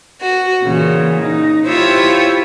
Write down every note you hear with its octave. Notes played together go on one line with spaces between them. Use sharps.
F#4
A#2 C#3 E3
D#4
E4 F4 G4 C5 C#5 E5